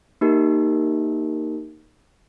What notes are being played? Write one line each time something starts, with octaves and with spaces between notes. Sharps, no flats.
A#3 D#4 G4 A#4